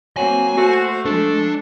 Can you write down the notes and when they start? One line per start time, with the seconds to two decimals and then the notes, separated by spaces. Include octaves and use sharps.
0.17 F#3 A#3 C4 G#5
0.57 A3 F#4 C5
1.05 F3 G#3 D4 A4